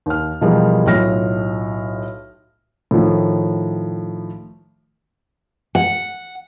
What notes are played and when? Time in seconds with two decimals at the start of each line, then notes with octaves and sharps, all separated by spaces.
0.06 D#2 F6
0.41 B2 E3 F3 G3 G#4 A#4
0.86 B1 A2 F4 F6 A#6
2.91 A2 D#3 F3
5.75 F#5